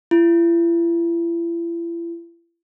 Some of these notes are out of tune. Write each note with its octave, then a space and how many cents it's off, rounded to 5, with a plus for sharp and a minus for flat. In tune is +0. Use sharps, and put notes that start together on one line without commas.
E4 +40